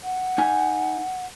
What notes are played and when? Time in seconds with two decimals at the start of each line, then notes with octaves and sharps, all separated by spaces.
0.04 F#5
0.38 D#4 G#5